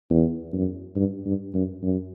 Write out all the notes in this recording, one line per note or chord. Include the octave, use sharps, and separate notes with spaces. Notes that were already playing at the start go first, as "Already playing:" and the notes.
E2
F#2
G2
G2
F#2
F#2